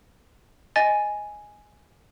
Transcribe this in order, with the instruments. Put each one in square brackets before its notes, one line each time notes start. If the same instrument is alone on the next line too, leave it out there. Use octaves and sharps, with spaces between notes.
[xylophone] D#5 G#5 A6